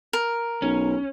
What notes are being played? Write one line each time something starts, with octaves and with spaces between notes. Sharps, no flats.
A#4
B1 C#4